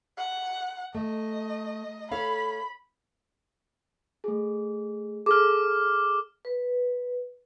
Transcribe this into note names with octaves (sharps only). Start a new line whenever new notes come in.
F#5
A3 D#5
A4 C#5 F5 B5
A3 G#4
G#4 A4 D6 F6
B4